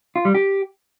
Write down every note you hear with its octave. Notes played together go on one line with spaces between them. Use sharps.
F4
G3
G4